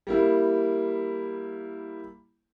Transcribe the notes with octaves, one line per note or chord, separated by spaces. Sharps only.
G3 A#3 E4